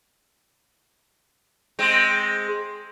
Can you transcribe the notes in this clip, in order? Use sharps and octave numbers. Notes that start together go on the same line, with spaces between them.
G#3 C4